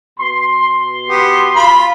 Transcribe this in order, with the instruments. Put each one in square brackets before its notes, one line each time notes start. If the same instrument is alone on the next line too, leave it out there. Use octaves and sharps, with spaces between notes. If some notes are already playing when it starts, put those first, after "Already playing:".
[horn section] B2 C6
[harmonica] B3 G4
F4 B5